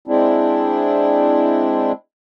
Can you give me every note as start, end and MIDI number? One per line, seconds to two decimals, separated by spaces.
0.08 1.92 56
0.08 1.92 60
0.08 1.92 62
0.08 1.92 64